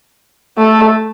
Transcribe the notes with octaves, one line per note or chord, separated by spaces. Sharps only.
A3